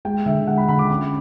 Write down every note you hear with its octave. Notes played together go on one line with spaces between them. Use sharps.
G#3 G5
D3 E5
G#3 F#5
B5
D3 B5
D6
C#4 D6